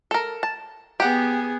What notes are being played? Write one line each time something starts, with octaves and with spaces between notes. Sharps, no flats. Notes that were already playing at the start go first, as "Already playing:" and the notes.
A4 A#4
A5
B3 G4 G#4 F#5